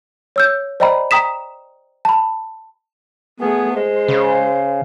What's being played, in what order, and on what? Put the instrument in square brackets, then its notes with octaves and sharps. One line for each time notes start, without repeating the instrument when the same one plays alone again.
[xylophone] C#5 E6 G6
C5 D5 D#5 G5 A#5 B5
G5 A#5 D#6 B6 E7
A5 B5
[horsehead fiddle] A3 G#4 [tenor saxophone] B3
[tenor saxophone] G#3 [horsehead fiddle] C5
[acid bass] C#3